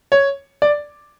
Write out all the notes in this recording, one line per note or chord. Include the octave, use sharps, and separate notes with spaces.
C#5
D5